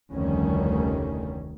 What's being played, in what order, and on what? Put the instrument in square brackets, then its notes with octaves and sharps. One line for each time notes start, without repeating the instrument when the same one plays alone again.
[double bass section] F1 D2 D#3 G3 C#4